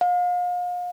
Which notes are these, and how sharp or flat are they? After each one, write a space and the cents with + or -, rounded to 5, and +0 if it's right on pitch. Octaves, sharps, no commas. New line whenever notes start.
F5 +35